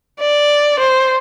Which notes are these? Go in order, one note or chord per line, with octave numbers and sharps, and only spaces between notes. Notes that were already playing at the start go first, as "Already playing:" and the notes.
D5
C5